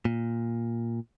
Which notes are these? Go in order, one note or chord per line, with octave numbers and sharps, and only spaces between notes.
A#2